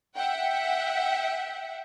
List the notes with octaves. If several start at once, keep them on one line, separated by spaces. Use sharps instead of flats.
E5 F#5 G5